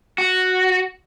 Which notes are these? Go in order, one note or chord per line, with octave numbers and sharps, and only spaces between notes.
F#4